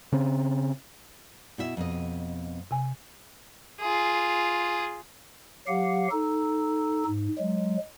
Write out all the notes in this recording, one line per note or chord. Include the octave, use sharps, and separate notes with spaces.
C#3 C4
B2 E4 E5
F2 B2 D#5
C3 G#5
F4 G#4
F#3 G4 F5 F#5
D#4 A4
G#2
F#3 G#3